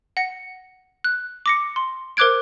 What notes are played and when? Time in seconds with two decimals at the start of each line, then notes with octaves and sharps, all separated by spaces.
0.17 F#5 A#6 C#7
1.04 F#6
1.46 D6 A#6 C#7
1.76 C6
2.17 A#4 C5 D6 F#6 G#6 D7